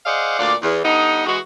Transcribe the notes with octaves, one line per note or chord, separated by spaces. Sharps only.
G#4 C5 D5 D#5 F5 F#5
D2 A#2 D4 F4 D5
E2
D3 G3 B3 D#4
E3 G#3 F#4